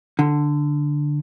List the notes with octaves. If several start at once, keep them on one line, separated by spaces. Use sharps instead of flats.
D3